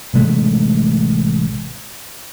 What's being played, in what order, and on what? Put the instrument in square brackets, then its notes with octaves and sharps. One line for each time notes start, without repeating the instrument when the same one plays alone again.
[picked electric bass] A1 C3 G#3 A3